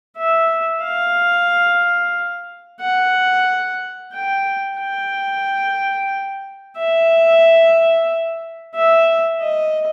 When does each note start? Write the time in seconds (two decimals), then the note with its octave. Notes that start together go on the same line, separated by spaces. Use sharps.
0.17 E5
0.83 F5
2.81 F#5
4.13 G5
4.80 G5
6.77 E5
8.75 E5
9.41 D#5